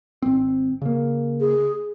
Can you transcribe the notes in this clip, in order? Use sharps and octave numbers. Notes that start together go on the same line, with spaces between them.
G#1 C4
C#3 A#3
G#4